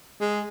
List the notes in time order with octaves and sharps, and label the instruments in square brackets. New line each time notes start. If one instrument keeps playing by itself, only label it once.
[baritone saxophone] G#3